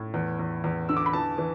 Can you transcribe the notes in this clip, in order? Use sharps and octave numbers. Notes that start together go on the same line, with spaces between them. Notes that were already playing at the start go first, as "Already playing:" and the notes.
Already playing: A2
E2
E2
E2
D3 E6
D6
B5
E3 A5
E3